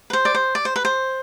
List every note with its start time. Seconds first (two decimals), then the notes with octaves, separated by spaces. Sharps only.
0.10 B4
0.13 C5
0.25 D5
0.35 C5
0.55 D5
0.65 C5
0.76 B4
0.85 C5